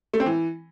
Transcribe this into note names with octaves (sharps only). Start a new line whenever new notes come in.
A3
C4
E3